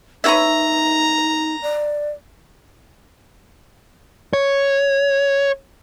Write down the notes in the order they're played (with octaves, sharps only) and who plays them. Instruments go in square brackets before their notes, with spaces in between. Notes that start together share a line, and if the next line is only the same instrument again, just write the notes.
[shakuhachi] D#4 [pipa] B4 C#5 E5 [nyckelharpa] A#5
[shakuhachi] D5
[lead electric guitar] C#5